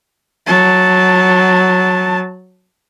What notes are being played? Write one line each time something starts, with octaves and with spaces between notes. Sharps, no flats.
F#3 A5